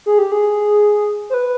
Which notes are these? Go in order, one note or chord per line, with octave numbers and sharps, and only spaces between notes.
G#4
G4
G#4
C5
B4